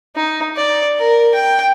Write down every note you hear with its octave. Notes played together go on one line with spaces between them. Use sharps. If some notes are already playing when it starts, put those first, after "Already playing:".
D#4
D5
A#4
G5